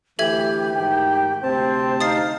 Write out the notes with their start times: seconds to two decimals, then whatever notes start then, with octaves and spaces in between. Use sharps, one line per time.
0.19 D2 E3 G4 A4 E5 G#6
0.76 G#2 D#3 G5
1.43 D2 C3 C4 C5 A5
2.01 D#4 F5 D#6 A6 C7